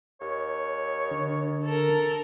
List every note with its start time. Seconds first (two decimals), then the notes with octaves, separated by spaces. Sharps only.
0.21 D#2 C#5
1.11 D3
1.64 A4 A#4